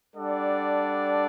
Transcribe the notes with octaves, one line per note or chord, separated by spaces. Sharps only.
G3 D4 A4 D5 F#5